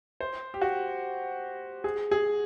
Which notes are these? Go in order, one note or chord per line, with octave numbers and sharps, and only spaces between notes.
C5
G4
F#4
G#4
G#4